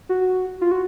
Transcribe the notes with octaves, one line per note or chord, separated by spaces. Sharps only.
F#4
F4
F#4